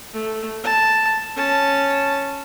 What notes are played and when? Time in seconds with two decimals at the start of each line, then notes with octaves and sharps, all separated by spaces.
0.14 A3
0.64 A5
1.36 C#4 A5